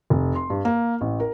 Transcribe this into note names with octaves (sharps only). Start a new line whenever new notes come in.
F1
C6
G2
A#3
A1
A#4